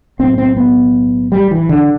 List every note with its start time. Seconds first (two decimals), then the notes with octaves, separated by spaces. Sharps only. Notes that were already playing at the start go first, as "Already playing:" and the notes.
0.19 B1 A2 C4
0.38 C4
0.57 B3
1.32 G3
1.51 E3
1.69 D3